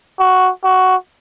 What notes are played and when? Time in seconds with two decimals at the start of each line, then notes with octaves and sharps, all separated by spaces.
0.19 F#4
0.64 F#4